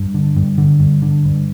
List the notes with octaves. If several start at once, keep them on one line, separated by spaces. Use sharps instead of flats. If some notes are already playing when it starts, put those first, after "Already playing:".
Already playing: G2
D3
G2
D3
G2
D3
G2